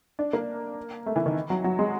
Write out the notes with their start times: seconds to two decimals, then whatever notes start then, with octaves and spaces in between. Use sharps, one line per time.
0.19 D4
0.33 A#3
1.06 A3
1.16 E3
1.26 D#3
1.50 F#3
1.64 F#3
1.79 G#3